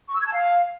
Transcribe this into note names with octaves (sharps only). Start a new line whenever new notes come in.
C#6
E6
G#6
A5
F5